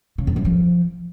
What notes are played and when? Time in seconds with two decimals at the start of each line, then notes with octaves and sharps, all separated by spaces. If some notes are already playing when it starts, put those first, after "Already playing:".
0.18 C#3
0.27 F2
0.36 F#2
0.45 F3